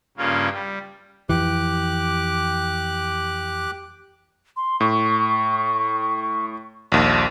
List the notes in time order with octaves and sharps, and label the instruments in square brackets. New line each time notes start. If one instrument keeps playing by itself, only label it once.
[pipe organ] G2 C#3 A#3 C#4 F4
G3
[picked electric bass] F2 E3 [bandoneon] G4 D6 F#6
[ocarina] C6
[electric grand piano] A2 [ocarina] C#6
[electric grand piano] A#1 D#2